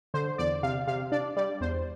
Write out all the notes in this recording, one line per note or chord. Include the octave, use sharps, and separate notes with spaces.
D3 C5
E2 D5
C3 F5
C3 F5
D4 D5
G3 D5
E2 C5